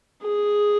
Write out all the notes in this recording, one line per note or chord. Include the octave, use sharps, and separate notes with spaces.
G#4